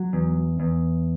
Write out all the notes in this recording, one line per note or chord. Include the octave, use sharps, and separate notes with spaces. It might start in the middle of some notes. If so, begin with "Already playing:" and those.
Already playing: F#3
E2
E2